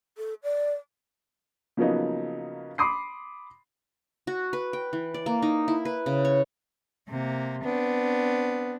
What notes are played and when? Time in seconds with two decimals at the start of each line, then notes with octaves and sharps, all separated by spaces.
0.18 A4
0.43 D5
1.77 C#3 F3 F#3 A#3 B3 D#4
2.78 B5 C6 D6 D#6 C7
4.27 F#4
4.53 B4
4.73 G5
4.93 E3
5.14 D5
5.26 A#3
5.42 D#4
5.68 E4
5.85 B4
6.06 C#3
6.25 C#5
7.09 C3 A#3
7.64 B3 C4 D4